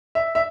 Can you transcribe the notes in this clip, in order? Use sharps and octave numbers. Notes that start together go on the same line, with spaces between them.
E5
E5